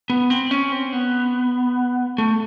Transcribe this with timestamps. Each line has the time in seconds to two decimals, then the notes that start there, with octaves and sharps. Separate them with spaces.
0.10 B3
0.30 C4
0.51 C#4
0.72 C4
0.93 B3
2.18 A3